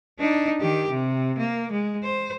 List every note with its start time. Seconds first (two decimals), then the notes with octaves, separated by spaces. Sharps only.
0.20 D4 D#4
0.61 D#3 G4
0.91 C3
1.38 A#3
1.72 G#3
2.04 C5